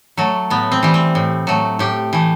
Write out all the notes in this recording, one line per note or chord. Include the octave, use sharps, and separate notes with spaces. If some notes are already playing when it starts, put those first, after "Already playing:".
F#3 A3
A2 B3
C4
E3 G3
C4
A2
F#3 A3
A2 G4
E3 A3